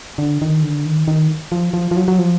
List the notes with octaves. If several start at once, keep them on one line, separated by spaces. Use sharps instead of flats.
D3
D#3
D3
D#3
D#3
F3
F3
F3
F#3
F#3
F3